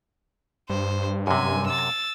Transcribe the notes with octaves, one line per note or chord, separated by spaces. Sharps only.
G2 C5
F#2 C3 G#5
E6 A6